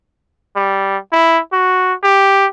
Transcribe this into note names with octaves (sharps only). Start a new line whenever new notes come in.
G3
E4
F#4
G4